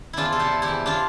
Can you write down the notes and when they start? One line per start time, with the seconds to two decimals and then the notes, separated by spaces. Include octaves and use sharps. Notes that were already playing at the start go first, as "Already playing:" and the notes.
0.13 E2 D4 E4 F4
0.32 C3 A4
0.40 E4 G4
0.52 C3
0.62 E4 G4
0.68 E2
0.86 D4 F4